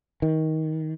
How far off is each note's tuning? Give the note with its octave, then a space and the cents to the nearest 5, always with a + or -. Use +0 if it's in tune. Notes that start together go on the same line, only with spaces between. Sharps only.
D#3 +20